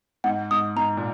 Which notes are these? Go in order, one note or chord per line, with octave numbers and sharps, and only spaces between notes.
G#2 F#5
G#2 D#6
G#2 A#5
A#2